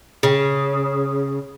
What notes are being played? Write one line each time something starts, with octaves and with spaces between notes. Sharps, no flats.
C#3